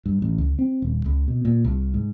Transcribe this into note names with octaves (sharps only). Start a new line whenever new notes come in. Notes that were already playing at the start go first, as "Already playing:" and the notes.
G2
A1
C#2
C4
D#1
C#2
B2
A#2
C2
G#2